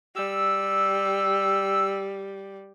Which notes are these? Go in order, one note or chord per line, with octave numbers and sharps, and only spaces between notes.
G3 E6